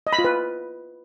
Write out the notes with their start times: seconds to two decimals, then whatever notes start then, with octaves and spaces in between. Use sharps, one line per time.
0.07 D#5
0.13 B5
0.19 F4
0.25 B4